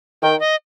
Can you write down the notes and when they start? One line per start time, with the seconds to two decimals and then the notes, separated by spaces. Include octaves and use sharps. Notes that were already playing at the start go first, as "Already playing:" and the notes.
0.22 D#3 G5
0.40 D#5